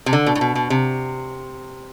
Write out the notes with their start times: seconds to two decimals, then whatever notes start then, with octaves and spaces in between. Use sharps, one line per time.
0.06 C3
0.13 D3
0.26 B2
0.35 A2
0.41 B2
0.55 B2
0.70 C3